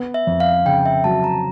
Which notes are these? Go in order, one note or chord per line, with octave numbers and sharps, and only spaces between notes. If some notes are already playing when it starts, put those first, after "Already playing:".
Already playing: B3
E5
F2
F5
C#3 G5
E5
F#3 A5
A#5